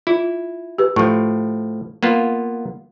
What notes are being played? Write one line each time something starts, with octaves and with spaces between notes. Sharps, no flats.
E4 F4
G4 B4
A2 F3 C#6
A#3 B3 F4